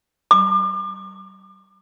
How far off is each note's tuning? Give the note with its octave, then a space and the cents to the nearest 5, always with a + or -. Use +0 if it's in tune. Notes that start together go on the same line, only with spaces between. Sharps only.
D6 +40